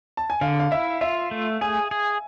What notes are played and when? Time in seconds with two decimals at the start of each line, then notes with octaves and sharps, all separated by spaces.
0.17 A5
0.30 G#5
0.41 D3 F5
0.60 F5
0.71 E4 E5
1.01 F4 E5
1.31 A3
1.61 G#4 G#5
1.91 G#4